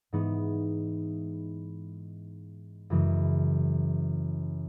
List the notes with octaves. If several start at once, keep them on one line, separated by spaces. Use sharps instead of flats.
G#2 E3 B3 D#4
F#2 C#3 E3 G#3